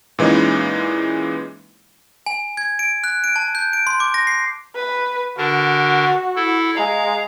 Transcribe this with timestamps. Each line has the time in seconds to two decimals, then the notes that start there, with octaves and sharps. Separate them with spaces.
0.19 A#2 E3 G#3 C#4 D#4
2.26 G#5
2.57 G#6
2.79 D7
3.04 F#6
3.24 D7
3.36 A5
3.55 G6
3.73 D7
3.87 C6
4.00 D6
4.14 A#6
4.27 C7
4.75 B4
5.38 D3 D4 F#4 A#4
6.35 E4 A4
6.76 G#3 F5 A#5